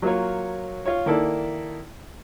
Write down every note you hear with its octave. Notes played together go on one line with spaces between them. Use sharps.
F#3 A#3 F4 C#5
F4 C#5
D#3 A#3 E4 A4 D5